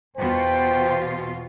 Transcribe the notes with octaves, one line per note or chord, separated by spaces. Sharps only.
E2 B2 F4 C5 G5